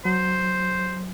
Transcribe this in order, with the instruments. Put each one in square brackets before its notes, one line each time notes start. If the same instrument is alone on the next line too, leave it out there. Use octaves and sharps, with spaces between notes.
[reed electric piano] F#3 [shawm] C5